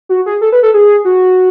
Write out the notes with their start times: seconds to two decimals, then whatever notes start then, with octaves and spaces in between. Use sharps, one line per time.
0.09 F#4
0.26 G#4
0.41 A4
0.52 B4
0.63 A4
0.74 G#4
1.05 F#4